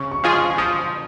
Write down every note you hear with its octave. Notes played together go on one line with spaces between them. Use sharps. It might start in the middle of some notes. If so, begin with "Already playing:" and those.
Already playing: C#3 C#6
C#6
F3 G#3 F4 G#4
D#6
F3 D#6